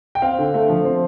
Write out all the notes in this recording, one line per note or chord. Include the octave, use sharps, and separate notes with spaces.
G5
C4 F5
D3
A3
F3
C4